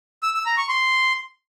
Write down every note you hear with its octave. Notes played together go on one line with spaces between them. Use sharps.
E6
E6
A#5
C#6
C6